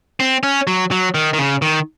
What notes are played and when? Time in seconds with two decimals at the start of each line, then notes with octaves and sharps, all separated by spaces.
0.20 C4
0.43 C#4
0.67 F#3
0.91 F#3
1.15 D#3
1.33 D#3
1.39 C#3
1.62 D#3